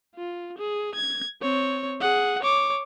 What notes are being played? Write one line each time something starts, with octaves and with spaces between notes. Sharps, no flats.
F4
G#4
G#6
C4 C#5
G#4 F#5
C#5 D6